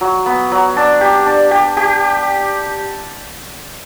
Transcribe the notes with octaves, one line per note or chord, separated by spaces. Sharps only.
F#3
B3
F#3
D4
G4
D4
G4
G4